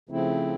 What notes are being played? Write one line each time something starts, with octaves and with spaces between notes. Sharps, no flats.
C#3 F3 A3 C4 E4